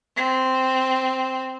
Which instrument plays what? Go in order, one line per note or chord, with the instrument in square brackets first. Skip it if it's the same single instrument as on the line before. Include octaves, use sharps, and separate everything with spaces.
[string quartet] C4